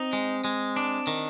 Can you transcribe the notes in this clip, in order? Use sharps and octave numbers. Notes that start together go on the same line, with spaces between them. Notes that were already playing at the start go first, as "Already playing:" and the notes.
Already playing: C4 D#4
G#3
G#3
D4
D#3